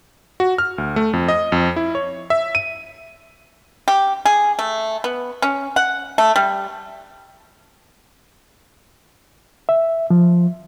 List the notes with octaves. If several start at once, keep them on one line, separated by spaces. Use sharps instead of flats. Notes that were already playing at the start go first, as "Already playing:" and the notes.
F#4
F6
D2
A3
F2
D#5
F2
E4
C#5
E5
D#7
G4
G#4
A3
B3
C#4
F#5
A3
G3
E5
F3